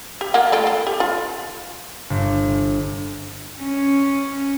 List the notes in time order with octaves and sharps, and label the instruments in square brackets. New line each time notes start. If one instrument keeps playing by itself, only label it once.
[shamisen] G4
A#3 F4 F#5
A3 F4 G5
A4
G4
F4
[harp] G1
[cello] C#4